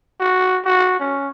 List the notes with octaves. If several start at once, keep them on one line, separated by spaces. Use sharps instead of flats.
F#4
F#4
C#4